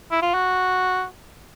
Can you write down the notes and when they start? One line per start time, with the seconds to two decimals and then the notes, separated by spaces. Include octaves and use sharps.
0.11 E4
0.22 F4
0.34 F#4